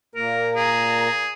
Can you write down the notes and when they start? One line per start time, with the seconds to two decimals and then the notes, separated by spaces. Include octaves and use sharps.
0.15 A#2 A#3 A#4
0.56 G#4 A#5